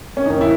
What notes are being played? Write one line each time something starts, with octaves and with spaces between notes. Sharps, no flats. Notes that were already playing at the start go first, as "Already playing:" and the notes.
C#4
D#2 D#3 D#4
E4